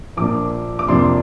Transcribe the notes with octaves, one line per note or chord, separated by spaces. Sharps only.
A#1 A#2 A#3 D4 D6
D6
F2 C3 A#3 D4 C6